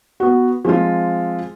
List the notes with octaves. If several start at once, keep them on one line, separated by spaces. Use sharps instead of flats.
B3 F#4
F3 G#3 C4 F4